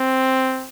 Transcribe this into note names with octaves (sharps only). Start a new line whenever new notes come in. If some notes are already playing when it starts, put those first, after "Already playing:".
Already playing: C4